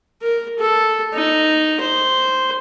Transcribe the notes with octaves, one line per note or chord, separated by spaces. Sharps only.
A#4
A4
D#4
C5